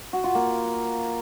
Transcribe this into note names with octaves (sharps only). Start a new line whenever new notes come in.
F#4
F4
A#3